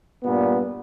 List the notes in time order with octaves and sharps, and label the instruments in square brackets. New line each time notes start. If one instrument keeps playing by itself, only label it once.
[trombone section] G2 A#2 B3